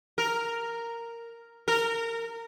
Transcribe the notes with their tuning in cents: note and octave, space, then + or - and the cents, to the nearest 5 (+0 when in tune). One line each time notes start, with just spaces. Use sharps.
A#4 -5
A#4 -20